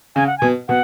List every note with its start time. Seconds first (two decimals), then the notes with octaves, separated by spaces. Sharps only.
0.16 C#3 G#5
0.27 F#5
0.38 B2 G#5
0.68 B2 F#5